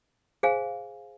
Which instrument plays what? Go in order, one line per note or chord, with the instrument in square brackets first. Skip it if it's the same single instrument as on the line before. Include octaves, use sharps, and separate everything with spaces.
[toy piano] G#4 C5 F5 G#5